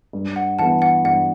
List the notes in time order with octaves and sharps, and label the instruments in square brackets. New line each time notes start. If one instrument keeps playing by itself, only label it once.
[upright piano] G2
[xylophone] F#5
[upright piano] E3 B3 [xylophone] F#5 A5
[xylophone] F#5
[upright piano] G2 [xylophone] F#5